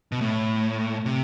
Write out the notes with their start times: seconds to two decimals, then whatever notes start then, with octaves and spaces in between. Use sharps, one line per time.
0.12 B2
0.21 A2
1.06 C3